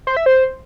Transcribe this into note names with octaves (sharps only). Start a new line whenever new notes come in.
C5
E5
C5